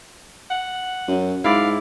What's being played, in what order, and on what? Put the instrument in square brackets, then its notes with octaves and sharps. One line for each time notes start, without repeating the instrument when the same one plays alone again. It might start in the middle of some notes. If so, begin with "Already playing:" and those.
[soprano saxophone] F#5
[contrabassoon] F#2
[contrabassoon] G#2 [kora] E4 D5 [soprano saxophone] F5